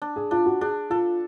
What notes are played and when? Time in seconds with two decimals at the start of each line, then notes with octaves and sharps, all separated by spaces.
0.02 D4
0.16 G#4
0.31 D4 F4
0.46 F#4
0.61 D4 G#4
0.90 F4 A4